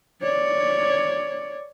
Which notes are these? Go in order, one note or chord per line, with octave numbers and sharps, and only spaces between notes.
C#5 D5